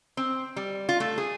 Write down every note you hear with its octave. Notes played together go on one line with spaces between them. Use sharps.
C4
G3
F4
A3
G#4